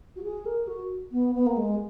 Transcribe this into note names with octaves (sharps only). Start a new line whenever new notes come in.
F#4
G#4
A#4
F#4
B3
B3
A#3
G#3